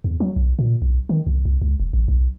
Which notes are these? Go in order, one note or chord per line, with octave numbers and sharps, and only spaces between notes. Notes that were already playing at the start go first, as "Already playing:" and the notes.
E2
F#3
B1
A#2
B1
D#3
C2
C2
C#2
E1
A1
B1